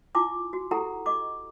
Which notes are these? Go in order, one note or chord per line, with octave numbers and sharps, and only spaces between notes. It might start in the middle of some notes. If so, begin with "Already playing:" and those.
E4 F4 G#5 D6
F#4
E4 G4 A4 F#5 A#5
D#5 D6